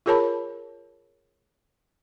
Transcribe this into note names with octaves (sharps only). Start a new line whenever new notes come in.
F4 G#4 A#4 C#5 A5 B5